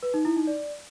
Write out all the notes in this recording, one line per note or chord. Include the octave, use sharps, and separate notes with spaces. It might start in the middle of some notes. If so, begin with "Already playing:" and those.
B4
D#4
E4
D#4
D5